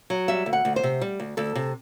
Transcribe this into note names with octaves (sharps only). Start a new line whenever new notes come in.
F#3
G3 E5
D2
F#5
D2
C5
C3
G3
D2
D2 A4
C3